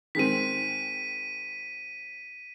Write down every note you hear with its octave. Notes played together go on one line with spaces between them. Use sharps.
D#3 G#3 C4 B6 D#7